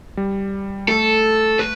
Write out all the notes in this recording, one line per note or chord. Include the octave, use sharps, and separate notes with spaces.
G3
A3 A4
B4